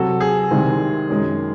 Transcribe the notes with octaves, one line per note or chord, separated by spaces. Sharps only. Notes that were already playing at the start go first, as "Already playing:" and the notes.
Already playing: C3 F#3 C4 F#4 A4
G#4
C2 C3 D#3 G#3 C4
F#2 D#3 G#3